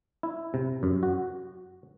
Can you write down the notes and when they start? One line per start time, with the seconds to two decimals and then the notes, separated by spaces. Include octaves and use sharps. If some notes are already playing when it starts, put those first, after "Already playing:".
0.23 E4
0.54 C3
0.83 F#2
1.03 F#4